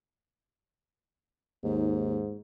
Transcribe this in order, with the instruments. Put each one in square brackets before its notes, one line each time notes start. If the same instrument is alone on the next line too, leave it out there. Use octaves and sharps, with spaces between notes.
[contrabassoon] D#2 [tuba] G#2